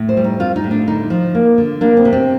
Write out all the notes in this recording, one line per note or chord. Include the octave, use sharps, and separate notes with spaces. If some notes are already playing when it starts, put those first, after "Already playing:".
Already playing: A2
C5
G3
D#4
C4 F4
D#4
A2
D4
D3 D#4
F3
A#3
D3
A#3 D4
C4
C3
C4